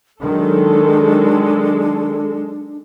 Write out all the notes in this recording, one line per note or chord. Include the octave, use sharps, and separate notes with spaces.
D#3 F#3 G#3 D4 A4